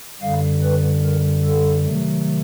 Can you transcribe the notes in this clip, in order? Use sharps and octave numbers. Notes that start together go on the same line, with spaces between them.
F#2 D3 G3 F5
B4
A#4
A4
C3 D#3 F#3 A3